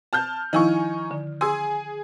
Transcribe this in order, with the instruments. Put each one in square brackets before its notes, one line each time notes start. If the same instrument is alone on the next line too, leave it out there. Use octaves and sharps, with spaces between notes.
[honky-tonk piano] A5 F6 G6
[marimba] D#3 F3 E4 [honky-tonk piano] D#4 G#5 C#6
[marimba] D3
[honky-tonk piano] G#4 G#5 [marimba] C6 D#6 E6